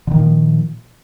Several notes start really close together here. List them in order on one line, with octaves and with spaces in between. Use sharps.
D3 D#3 A#2 F3